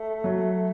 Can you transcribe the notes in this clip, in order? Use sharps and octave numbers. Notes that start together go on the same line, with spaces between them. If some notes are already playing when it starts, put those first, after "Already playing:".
Already playing: A3
F#3